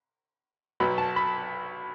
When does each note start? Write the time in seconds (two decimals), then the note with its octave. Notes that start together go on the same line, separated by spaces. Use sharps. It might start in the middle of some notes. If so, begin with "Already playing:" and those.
0.80 B1 B2 F#3 B3 B5
0.98 A5
1.16 B5